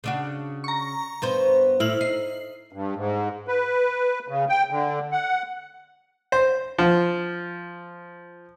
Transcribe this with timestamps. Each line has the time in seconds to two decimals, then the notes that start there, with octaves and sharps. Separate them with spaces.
0.04 C#3 D4 F#4
0.64 A#5 C#6
1.22 G2 B3 C5
1.80 A2 E4 C5 F6 F#7
2.01 D#4 C7
2.72 G2
2.96 G#2
3.48 B4
4.28 C#3
4.49 G5
4.71 D3
5.12 F#5
6.32 C5
6.79 F3